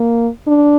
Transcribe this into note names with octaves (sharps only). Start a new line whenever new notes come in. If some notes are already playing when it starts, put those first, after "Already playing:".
Already playing: A#3
D4